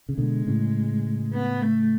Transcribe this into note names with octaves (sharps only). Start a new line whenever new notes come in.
C#3
B2 D3 G#3
A2 C#3
B3
A3